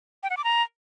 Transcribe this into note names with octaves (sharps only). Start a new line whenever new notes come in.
G5
F#5
D6
A#5